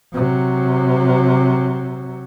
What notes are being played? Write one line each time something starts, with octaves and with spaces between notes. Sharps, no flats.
C3 F#3